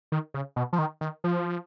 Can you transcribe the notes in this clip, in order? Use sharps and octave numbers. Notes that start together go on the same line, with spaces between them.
D#3
C#3
B2
F3
D#3
D#3
F3